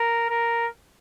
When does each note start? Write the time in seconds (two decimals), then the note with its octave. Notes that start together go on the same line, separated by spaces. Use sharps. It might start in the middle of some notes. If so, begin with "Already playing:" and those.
Already playing: A#4
0.30 A#4